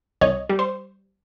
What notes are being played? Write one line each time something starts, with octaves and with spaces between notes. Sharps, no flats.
C2 C#5 D#5
G3
C5